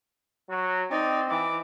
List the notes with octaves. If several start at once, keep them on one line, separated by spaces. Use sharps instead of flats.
F#3 F#4
C4 D#4 D5
E3 D6